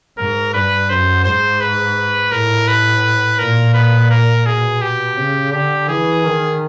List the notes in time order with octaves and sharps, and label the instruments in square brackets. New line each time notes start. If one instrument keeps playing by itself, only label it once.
[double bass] G#2 [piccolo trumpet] A#4
[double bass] G2 [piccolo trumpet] B4
[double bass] F#2 [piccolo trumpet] C5
[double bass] G#2 [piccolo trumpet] C5
[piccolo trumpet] B4
[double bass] A2 [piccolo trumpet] A#4
[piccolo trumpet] B4
[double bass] A#2 [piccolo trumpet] A#4
[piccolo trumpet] B4
A#4
[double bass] B2 [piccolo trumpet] G#4
[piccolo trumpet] G4
[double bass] C#3
[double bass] D3 [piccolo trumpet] G4
[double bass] E3 [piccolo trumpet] G#4
[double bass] D#3